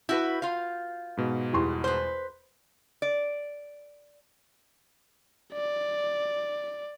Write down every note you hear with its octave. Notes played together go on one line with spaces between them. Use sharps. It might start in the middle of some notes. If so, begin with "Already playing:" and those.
E4 F#4 B4 G6
F4 F5
G#2 B2
E2 G3 C6
B4 C5
D5
D5